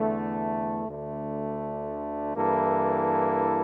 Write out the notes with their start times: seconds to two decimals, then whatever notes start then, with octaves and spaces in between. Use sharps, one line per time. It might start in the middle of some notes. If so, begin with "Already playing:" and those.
Already playing: E2 D3 A3
0.87 D2 D3 A3
2.36 G2 E3 A#3 E4 A4